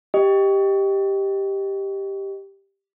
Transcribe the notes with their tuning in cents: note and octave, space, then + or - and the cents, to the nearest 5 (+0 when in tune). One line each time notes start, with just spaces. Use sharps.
G4 +0 D#5 +0